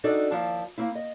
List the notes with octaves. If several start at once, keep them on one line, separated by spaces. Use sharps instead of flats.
C4 D4 D#4 F#4 A4 D5
D#2 F3 E4 D5 A5
A#3 C4 E4
D#5